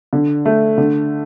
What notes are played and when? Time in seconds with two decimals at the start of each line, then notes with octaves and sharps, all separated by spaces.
0.13 D3
0.46 A3
0.78 D3